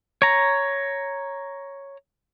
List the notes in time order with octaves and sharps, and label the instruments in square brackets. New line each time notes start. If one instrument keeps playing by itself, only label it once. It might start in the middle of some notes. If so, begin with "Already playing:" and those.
[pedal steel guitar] C#5 A#5